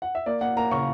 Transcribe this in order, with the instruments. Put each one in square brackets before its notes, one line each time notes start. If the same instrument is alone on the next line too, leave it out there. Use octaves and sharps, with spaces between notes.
[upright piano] F#5
E5
A#3 D5
A#3 F#5
A#3 A#5
C#3 C#6